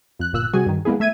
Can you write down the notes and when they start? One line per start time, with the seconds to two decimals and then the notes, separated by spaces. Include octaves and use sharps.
0.19 F2 F#6
0.33 G1 A#2 E6 F#6
0.53 C3 G3 F#4 G#4 G#5
0.66 G2 D#3
0.85 G#3 A#3 B3 E4 G#4
1.00 A3 E5 G#6 D#7